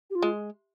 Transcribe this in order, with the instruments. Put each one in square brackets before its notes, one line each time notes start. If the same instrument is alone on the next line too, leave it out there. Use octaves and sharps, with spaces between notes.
[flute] G4
F4
[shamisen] G#3